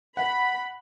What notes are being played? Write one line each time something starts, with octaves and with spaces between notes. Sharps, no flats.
F#5 B5